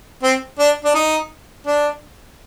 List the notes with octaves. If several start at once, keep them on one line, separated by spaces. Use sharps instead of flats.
C4
D4
D4
D#4
D4